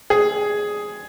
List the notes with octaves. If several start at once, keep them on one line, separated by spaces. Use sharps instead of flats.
G#4